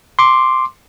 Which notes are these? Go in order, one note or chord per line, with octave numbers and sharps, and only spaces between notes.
C6 D6